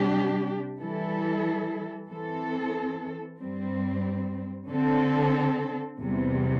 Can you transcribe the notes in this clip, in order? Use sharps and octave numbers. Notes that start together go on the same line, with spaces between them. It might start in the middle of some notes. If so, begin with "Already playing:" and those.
Already playing: C3 G3 D4 G4
E3 G3 E4 A4
E3 C4 A4
G2 G3 C4
D3 C4 A4
E2 C3 G3